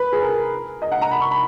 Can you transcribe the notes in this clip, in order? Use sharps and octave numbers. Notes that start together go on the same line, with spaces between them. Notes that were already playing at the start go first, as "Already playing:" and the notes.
Already playing: B4
G#4
A#4
D#5
F#5
A#5
B5
C#6
B5